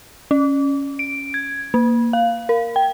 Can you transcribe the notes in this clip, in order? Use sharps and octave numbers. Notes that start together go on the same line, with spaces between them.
C#4
D7
G#6
A#3
F5
A#4
G5